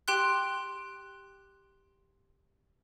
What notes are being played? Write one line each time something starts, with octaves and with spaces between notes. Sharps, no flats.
G4 G5 C6 F#6